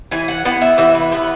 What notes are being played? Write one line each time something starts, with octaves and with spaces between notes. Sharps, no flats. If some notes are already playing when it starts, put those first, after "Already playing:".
E3 G#5
F#5
B3 F#5
E5
E3 E5
B4
B3 B4